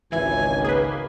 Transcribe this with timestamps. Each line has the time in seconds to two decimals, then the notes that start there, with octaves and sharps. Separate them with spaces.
0.12 G#1 C#2 E3 E4 G#5
0.64 A#3 G#4 B4